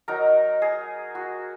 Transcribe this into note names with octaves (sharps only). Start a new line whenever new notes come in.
F#3 D#4 A#4
G#4
F#4